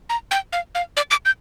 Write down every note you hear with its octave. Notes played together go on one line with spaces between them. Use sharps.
A#5
G5
F5
F5
D5
D6
G6